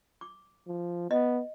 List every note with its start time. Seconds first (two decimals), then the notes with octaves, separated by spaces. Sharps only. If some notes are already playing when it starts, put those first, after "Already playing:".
0.21 D6
0.67 F3
1.11 B3 D#5